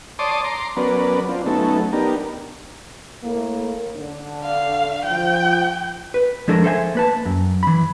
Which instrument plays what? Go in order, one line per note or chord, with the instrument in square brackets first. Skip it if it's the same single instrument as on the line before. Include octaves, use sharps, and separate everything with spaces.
[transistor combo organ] C#5 D5 A5 C6 D6 D#6
A#5 C6 D6
F#3 B3 C#4 A#4 B4 D5
C4 D4 F4
F#3 A3 B3 C#4 D#4 A4
B3 D4 D#4 G4 A#4
[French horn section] A2 A#3
D3 D4
[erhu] F5
[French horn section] F3 [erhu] G5
[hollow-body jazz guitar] B4
F3 G#3 D4 A4 A#4
A4 C5 E5 G5 G#5
A#3 B4 A5
F#2
E3 B5